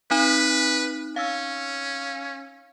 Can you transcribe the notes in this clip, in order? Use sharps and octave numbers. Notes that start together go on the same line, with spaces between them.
C4 D#4 B4
C#4 F5 E6